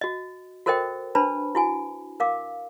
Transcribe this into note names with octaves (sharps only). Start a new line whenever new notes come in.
F#4 D#5
F#4 A4 A#4 C5 D#5 G5
D4 B4 C5 A5 B5
E4 F#4 G#5
A#4 F5 D6